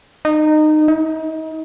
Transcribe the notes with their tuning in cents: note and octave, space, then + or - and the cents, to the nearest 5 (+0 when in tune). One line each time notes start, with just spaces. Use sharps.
D#4 -20
D#4 +35